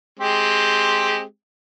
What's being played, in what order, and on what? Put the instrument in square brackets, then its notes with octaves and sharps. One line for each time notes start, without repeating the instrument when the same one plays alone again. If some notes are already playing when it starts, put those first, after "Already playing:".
[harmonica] G#3 C4 G4